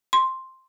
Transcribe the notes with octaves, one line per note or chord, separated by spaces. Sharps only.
C6